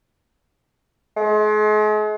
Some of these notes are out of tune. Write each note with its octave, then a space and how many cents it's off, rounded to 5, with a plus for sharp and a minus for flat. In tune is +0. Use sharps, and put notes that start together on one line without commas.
G#3 +40